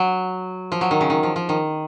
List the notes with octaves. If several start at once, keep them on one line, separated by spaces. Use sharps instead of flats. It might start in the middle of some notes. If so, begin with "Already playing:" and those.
Already playing: F#3
F3
F#3
D#3
C#3
D#3
F3
F3
D#3